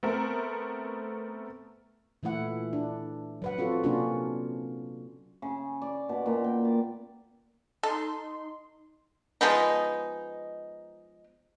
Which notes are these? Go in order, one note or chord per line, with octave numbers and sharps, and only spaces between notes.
A3 B3 C4 A4 A#4
A#2 E3 A3 E4 F#5
D4
F#3 B4 F#5
C4 F4 F#4 A4
C3 A#3 C#4 D4 F4 F#4
C#3
D5
B2
A#2
G5
D5
D#4 A4 C6
F3 G#3 B3 D#4